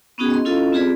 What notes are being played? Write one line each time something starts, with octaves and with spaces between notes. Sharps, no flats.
B3 C#4 D#4 F#4 G#4
D#5 C6
C#4 E4 F4 A4 D#5 F5
C4 F4 G4 G#4 B4 D5